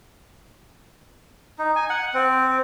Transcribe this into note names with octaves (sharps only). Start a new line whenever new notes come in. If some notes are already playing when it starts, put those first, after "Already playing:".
D#4
G#5
F#5
C4